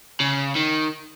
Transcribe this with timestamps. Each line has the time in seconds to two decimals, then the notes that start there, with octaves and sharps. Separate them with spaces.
0.20 C#3
0.55 D#3